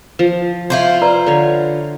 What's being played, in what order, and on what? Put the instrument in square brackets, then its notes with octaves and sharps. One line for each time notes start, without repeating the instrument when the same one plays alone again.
[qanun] F3
[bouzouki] E4 F4 C5
[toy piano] B4 D5 A#5
[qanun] D3 C#5